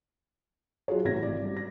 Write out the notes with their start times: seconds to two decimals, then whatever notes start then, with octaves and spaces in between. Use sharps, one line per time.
0.88 F#3 F4 F#4 G#4 C#5
1.05 A1 C3 F#4 G#6 A#6
1.23 G#1 D5
1.41 G2
1.57 A#6